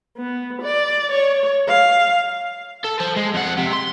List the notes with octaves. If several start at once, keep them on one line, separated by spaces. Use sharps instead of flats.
B3
D5
C#5
F5
A4
C5 A5
G#3
F2 F#5
C3
C6